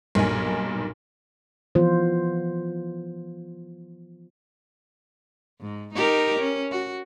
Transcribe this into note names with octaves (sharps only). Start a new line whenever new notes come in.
B1 G2 A#2 D#4 A#4 G#5
E3 F3 B3 F4 C5
G#2
D#4 G4 A#4
C#4
F#4